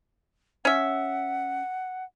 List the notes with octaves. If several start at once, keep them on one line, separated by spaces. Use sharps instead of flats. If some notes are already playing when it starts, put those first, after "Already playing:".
C#4 E5 F#5